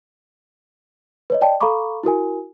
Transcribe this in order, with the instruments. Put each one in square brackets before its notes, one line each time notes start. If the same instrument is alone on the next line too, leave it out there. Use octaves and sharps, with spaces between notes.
[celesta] B4 C#5 D#5
D5 D#5 G5 A5
A4 F5 A#5 B5 C#6 D6
E4 F#4 A#4 G#5